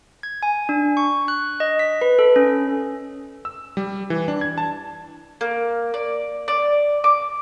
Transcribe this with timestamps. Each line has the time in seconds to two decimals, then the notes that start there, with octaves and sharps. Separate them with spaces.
0.23 G#6
0.43 G#5
0.69 D4
0.97 C#6
1.28 F#6
1.60 D#5
1.79 B6
2.01 B4
2.19 A4
2.36 C#4
3.45 E6
3.77 G3
4.10 E3
4.28 D4
4.41 G#6
4.58 A5
5.41 A#3
5.94 D5
6.48 D5
7.04 D6